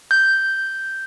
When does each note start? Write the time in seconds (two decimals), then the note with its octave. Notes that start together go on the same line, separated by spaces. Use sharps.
0.11 G6